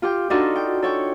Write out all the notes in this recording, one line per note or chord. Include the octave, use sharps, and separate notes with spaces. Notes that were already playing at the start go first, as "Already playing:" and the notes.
F4 G4 G5
D4 D#4 F4 F#4 A4 D#5
G5
A4 C#5 G5